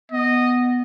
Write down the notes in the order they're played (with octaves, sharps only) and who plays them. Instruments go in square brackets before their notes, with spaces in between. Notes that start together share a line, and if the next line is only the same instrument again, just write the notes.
[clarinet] B3 [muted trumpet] D#5